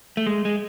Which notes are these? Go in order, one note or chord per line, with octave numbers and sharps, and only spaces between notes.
A3
G#3
G#3